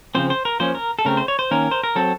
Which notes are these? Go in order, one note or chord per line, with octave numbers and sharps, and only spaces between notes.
C#3 F3 C4 C5
C5
A#4
F3 A#3 C#4 C5
A#4
A4
C#3 A3 C4 A#4
C5
C#5
C5
D#3 A#3 C#4 A#4
C5
A#4
F#3 C4 A4